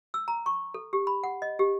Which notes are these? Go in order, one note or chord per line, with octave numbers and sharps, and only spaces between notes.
E6
A#5
C#6
A4
G4
B5
F#5
D#5
G4